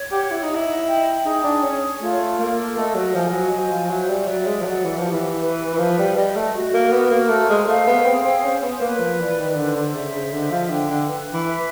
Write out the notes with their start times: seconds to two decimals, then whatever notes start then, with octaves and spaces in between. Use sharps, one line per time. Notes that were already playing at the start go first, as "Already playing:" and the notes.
Already playing: C#5
0.11 G4 F#5
0.30 E4
0.43 D#4
0.50 E4 D#5
0.87 G5
1.25 D#4 G#4
1.43 D4
1.63 C#4 C#5
2.00 A3 F4
2.38 A#3 A4
2.76 A3 D#5
2.95 F#3
3.14 F3 G#5
3.29 F3
3.32 F#3
3.52 F#3 C5
3.71 F3
3.90 F#3 E5
4.09 G3
4.27 F#3 D5
4.46 G#3
4.61 F3
4.65 F#3 F#5
4.84 E3
4.97 F3
5.03 G4
5.12 E3
5.41 B4
5.73 E3
5.78 F3 B4
5.98 G3
6.16 G3 D#5
6.35 A3
6.55 F#4
6.74 A#3
6.92 B3 A#4
7.10 A#3
7.29 A3 C5
7.49 G#3
7.68 A3 F5
7.87 B3
8.05 C4 G#4
8.25 C4
8.44 C#4 C5
8.63 B3
8.81 A#3 B4
9.00 F3
9.19 E3 D5
9.38 D#3
9.56 D3 C5
9.76 D3
9.94 C#3 E5
10.14 C#3
10.32 D3 D#5
10.51 F3
10.70 D3 G5
10.90 D3
11.08 B4
11.33 E3
11.46 E5